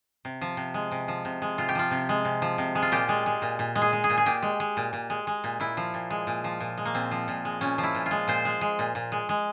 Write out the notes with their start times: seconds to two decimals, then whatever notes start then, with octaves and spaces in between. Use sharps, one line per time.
0.25 C3
0.41 F3
0.57 C3
0.74 G#3
0.91 C3
1.08 F3
1.25 C3
1.42 G#3
1.58 C3 F4
1.69 G4
1.75 F3 F4
1.91 C3
2.09 G#3
2.25 C3
2.42 F3
2.58 C3
2.75 G#3
2.82 F4
2.92 A#2 G4
3.09 G#3
3.26 G#3
3.42 A#2
3.59 A#2
3.75 G#3
3.82 G#4
3.93 G#3
4.04 G#4
4.10 A#2
4.18 G#4
4.26 A#2 G4
4.43 G#3
4.60 G#3
4.77 A#2
4.93 A#2
5.10 G#3
5.27 G#3
5.44 A#2
5.60 A#2 E4
5.77 F3
5.94 A#2
6.10 G#3
6.27 A#2
6.44 F3
6.60 A#2
6.78 G#3
6.85 A#3
6.94 A#2 C4
7.11 F3
7.28 A#2
7.45 G#3
7.61 A#2 C#4
7.78 F3
7.84 E4
7.95 A#2
8.06 F4
8.11 G#3
8.28 A#2 C5
8.45 G#3
8.61 G#3
8.79 A#2
8.95 A#2
9.12 G#3
9.29 G#3